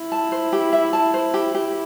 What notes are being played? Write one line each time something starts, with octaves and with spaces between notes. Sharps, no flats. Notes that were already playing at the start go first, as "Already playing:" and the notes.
Already playing: E4
A5
C5
G4
E5
A5
C5
G4
G4